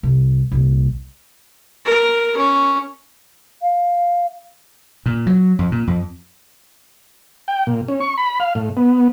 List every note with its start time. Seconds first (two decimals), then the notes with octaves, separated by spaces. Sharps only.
0.03 C2
0.51 C2 A#2
1.85 A#4
2.37 C#4
3.62 F5
5.06 A#2
5.27 F#3
5.59 F2
5.72 A#2
5.87 F2
7.48 G5
7.67 A#2
7.88 C#4
8.00 C#6
8.17 B5
8.40 F5
8.55 A2
8.77 B3